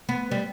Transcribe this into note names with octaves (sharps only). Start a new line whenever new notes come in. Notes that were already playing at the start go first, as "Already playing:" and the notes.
B3
G3